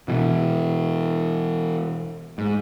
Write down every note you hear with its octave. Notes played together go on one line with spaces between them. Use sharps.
B2 E3
G#2